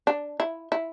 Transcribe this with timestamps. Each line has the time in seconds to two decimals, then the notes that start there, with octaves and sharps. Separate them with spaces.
0.07 D4
0.40 E4
0.72 E4